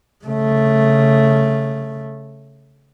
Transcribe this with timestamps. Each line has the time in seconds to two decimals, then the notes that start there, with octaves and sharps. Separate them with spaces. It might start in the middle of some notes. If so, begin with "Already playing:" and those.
0.25 C#3 A3